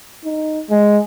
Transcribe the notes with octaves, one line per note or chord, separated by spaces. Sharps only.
D#4
G#3